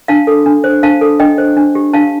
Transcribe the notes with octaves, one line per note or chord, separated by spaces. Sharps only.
D4 F5 A5
A4
D4
C5
D4 F5 A5
A4
D4 D#5 G5
C5
D4
G4
D4 F5 A5